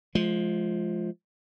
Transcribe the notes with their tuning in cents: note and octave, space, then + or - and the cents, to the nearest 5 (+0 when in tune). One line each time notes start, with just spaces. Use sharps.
F3 +0 G#3 +35